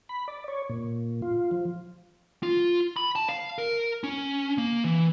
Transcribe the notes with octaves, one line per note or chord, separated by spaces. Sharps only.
B5
D5
C#5
A#2
F4
F3
F4
B5
A5
F5
A#4
C#4
A#3
E3